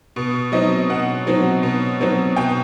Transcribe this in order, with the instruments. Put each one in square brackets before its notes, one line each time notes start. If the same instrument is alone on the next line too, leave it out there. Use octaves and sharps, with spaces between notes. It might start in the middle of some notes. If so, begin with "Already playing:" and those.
[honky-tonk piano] B2
F#3 C4 D#4 D#5
B2 F#5
F#3 C4 D#4
B2
F#3 C4 D#4
B2 G5